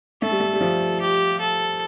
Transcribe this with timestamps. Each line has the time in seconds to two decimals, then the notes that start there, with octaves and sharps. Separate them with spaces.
0.22 A3 A4
0.31 G3
0.40 A3
0.53 G3
0.61 F3
1.01 G4
1.40 A4